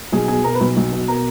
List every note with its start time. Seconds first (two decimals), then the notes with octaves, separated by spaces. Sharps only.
0.12 B1 G#4 G#5
0.28 B2 G#4 G#5
0.44 B2 A#4 A#5
0.55 B4 B5
0.61 B1
0.77 B1
0.92 B2
1.08 B2 A#4 A#5